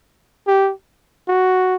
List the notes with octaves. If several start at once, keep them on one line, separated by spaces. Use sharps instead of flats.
G4
F#4